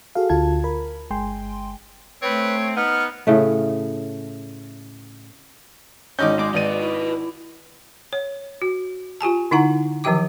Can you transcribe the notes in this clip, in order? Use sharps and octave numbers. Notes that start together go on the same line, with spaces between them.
F#4 G#4 A4 F5
D2 D3 F4 F5 A5 G#6
A#4 B5
G1 G#3 G5 G#5 C6
A3 C4 B4 C#5
B3 D#4 F6
A2 C#3 A3
G#1 C#4 D#4 D#5 D6 G6
G#3 D6
G#1 B4 D5 D#5 D#7
E4
C#5
F#4
F4 G4 G#5 A5
D3 D#4 E4 F#5 A#5
D#3 F3 F#3 G4 G5 D6